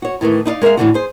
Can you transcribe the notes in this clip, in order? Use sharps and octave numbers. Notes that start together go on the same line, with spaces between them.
F#4 C#5
A2 D#3 E3 A3
D#4 E4 D5 F5
G#3 A#4 C5 E5 F5
A2 D3 E3 F3 D4 F#4
G#4 C5